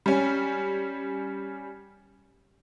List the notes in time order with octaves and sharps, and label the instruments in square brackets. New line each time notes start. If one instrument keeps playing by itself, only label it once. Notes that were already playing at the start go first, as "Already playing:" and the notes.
[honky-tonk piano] G3 C#4